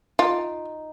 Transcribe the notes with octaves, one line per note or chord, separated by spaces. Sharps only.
D#4 F4